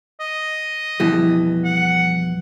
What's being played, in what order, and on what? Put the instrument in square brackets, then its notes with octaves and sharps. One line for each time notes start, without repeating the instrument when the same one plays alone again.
[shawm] D#5
[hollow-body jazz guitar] F2 B2 G3 [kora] E3
[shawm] F#5